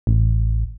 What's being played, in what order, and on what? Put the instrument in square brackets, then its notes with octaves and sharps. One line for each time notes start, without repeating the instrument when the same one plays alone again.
[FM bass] A1